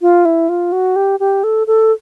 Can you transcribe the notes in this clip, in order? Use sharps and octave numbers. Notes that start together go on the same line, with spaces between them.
F4
E4
F4
F#4
G4
G4
A4
A4